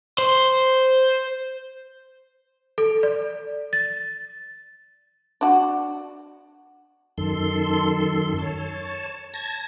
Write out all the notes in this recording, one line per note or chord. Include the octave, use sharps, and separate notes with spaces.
C5
A4
D5
A6
D4 F#4
F#2 D#3 A4 C6
C#5 A5
A5 G#6 A#6